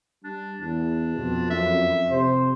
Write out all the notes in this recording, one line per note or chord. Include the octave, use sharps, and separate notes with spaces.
G3 D4
E2 D4
F2 B2
F#2 E5
C3 C5